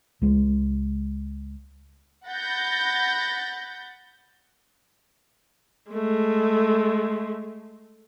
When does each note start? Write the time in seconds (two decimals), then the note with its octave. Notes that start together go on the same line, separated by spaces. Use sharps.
0.22 C#2 G#3
2.26 F#5 B5 G6 A6 A#6
5.91 G#3 A3